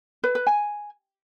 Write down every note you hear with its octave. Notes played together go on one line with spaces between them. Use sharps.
B4
B4
G#5